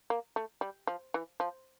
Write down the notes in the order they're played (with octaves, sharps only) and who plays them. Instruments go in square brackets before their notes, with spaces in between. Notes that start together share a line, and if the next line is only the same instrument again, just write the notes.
[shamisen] A#3
A3
G3
F3
E3
F3